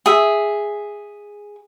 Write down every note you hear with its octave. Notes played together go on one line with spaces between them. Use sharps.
G#4 E5